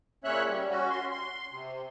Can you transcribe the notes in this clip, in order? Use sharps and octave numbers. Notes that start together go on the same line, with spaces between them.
A#2 C#3 C#4 C#5 E5 F#6
G3
C#4 F#4
C6
C6
C3